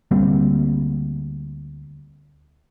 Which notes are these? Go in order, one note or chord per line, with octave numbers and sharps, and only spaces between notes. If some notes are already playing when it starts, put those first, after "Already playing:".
D2 G3 A#3 C4